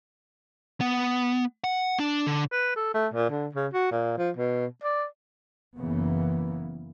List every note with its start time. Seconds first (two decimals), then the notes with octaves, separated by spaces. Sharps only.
0.81 B3
1.64 F#5
1.99 D4
2.27 D3
2.52 B4
2.76 A4
2.94 A3
3.14 A#2
3.30 D3
3.55 C#3
3.74 F#4
3.92 A#2
4.18 F3
4.37 B2
4.84 D5
5.78 F#1 C#3 E3 A#3 B3